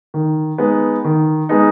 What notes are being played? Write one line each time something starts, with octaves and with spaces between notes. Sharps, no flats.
D#3
G#3 B3 D#4
D#3
G#3 B3 D#4